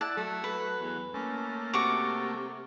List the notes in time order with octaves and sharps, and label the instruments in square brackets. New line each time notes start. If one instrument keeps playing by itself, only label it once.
[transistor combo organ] E4 D5 F#5 [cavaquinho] A5
[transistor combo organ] F#3 [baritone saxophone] A3
[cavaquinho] B4
[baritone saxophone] E2
[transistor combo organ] A3 A#3 [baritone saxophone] C#4
[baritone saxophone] C3 [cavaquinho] F#4 C#6 D6